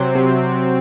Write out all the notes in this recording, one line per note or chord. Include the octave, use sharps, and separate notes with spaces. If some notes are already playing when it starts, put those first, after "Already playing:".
Already playing: C3 F#3 C4
C3